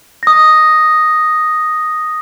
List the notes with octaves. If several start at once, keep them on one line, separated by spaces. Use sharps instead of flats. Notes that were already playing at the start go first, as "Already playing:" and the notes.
D#6 A#6